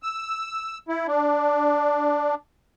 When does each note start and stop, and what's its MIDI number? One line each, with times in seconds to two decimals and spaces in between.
0.03 0.78 88
0.89 1.07 64
1.08 2.35 62